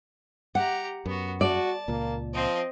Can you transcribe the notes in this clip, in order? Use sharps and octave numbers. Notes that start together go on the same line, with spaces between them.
G4 F#5 A#5
F#2 B3 F#4
F#4 D5 A5
C#2 A#2 A#3
F3 C4 D#5